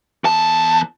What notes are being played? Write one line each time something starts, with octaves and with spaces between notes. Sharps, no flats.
E2 A5